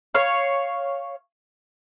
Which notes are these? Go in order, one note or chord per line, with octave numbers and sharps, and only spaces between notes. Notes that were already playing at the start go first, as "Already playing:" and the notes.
C#5 F5